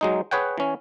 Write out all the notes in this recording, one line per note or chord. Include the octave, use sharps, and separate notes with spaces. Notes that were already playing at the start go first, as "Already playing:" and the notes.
F#3 G#3 D#4
G#4 B4 C#5 F#5 G5
E3 C#4